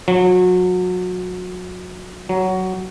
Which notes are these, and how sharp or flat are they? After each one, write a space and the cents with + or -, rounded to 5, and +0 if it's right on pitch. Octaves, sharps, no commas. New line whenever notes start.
F#3 -30
F#3 +10